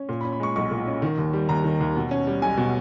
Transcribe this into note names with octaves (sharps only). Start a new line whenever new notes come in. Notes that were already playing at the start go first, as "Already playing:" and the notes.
Already playing: C#4
A#2
B5
C#4
B5
G#3 C#6
B1 C#6
A#2
C#4
D#3
D#2
G3
D#2 A#5
D#3
D#2
B2
C#4
G3
B1 G#5
B2